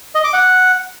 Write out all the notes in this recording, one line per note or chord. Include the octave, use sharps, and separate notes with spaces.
D#5
D6
F#5